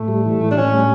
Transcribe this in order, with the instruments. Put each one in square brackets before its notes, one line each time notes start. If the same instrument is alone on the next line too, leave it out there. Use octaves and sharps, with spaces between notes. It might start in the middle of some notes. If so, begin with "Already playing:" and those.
Already playing: [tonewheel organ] A2 [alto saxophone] A3
[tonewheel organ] G3
E3
A2
[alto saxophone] D4
[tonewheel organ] A2 [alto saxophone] C#4
[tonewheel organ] G3